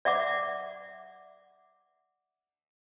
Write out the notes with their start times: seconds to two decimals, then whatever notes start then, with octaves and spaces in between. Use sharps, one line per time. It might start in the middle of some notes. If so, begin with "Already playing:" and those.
0.05 D5 E5 F#5 D6